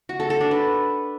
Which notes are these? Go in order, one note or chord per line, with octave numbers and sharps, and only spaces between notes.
F#4
A4
A4
D4
B4